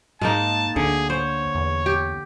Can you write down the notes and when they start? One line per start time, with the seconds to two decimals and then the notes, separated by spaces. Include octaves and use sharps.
0.21 G#2 G#3 A#3 D#4 A5
0.76 D2 D3 G#4
1.10 C5 C#5
1.55 E2
1.86 G4